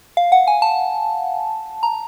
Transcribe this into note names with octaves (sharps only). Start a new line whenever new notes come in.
F5
F#5
G#5
A5
A#5